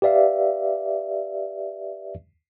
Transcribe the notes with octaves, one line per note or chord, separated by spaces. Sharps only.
G4 B4 D5 E5 F5